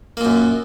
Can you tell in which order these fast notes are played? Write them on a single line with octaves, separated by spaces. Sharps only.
A#3 A#2 F#2